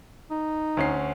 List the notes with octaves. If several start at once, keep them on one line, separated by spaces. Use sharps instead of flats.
D#4
D2 C#4 C7